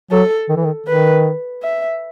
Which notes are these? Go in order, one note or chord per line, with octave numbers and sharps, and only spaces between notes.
F#3 A4
D#3
E3
D#3
D#3 B4
E5